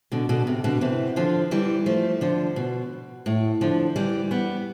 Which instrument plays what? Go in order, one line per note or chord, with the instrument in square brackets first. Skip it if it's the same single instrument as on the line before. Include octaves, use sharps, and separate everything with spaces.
[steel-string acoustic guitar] B2 D3
B2 D3
C3
B2 D3
C3 E3
D3 F3
E3 G3
F3 A3
D3 F3
B2
A2
D3 F3
E3 G3
G3 B3